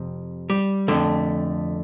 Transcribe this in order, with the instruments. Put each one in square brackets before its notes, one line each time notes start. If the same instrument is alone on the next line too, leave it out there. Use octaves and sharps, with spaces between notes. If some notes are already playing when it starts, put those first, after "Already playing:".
Already playing: [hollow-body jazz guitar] F2 C3
G3
F2 D3 A3